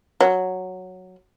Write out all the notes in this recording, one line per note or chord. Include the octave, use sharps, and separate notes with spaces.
F#3